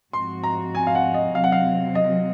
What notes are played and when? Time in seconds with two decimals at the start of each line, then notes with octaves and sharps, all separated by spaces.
0.13 G#2 F3 C4 F#4 C6
0.44 A#5
0.75 G#5
0.87 F5
0.95 F#5
1.14 D#5
1.34 C3 F#3 C4 F5
1.44 F#5
1.52 F5
1.95 D#5